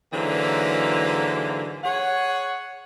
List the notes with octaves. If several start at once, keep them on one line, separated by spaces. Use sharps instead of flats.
G#2 D3 E3 F#3 A#3
G#4 C#5 F#5